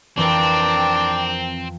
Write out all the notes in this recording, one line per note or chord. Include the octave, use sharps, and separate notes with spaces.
F2 E3 C4 D4 A#4 G5 C6